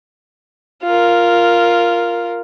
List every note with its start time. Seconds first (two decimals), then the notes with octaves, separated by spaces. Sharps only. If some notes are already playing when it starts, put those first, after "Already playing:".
0.84 F4 A#4